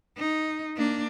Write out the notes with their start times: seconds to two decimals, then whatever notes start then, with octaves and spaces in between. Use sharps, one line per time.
0.18 D#4
0.77 A#3 D4